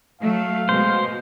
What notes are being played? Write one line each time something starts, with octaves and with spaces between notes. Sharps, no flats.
F#3 A3 F5
B2 G#3 C5